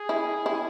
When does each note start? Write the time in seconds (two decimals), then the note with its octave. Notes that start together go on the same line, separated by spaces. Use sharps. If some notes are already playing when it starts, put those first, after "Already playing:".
Already playing: G#4
0.09 E4
0.46 E4